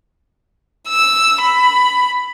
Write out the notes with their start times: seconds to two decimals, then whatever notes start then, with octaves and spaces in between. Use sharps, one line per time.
0.89 E6
1.42 B5